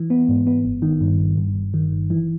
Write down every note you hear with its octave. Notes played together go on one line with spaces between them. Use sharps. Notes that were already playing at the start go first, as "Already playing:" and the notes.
Already playing: E3
B3
G#2
B3
G1
D#3
G2
G1
G2
G1
D#3
G1
E3